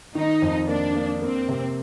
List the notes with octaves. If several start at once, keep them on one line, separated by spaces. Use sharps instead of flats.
D#3 D#4
F2
A#3 D4
A#3
A#3 C4
C3